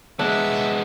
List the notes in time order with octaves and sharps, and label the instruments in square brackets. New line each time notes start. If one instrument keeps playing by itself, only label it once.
[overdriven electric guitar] G#3 B3 [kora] D4 [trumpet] E5